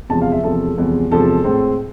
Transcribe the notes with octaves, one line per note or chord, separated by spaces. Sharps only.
E2 C3 F3 G#3 A5
F5
E5
E2 C3 F3 G#3 A4
E2 C3 F3 G#3
E2 C3 F3 G#3 A4
A2 G#3 C4